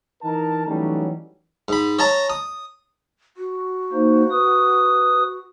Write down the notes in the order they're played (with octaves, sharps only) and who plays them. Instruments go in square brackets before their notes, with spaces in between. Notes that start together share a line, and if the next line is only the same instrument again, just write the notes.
[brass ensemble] E3 D#4 A#4 A5
E3 F#3 G3 A3 C#4 D#4
[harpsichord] G#2 B5
C#5 D#5 A5 A#5
D#6
[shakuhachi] F#4
[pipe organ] A#3 D#4 C5
B4 D#6